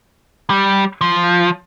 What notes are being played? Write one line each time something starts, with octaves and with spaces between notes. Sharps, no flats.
G3
F3